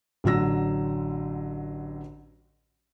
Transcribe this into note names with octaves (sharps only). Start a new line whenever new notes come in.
A1 D3 F#3 E6 A#6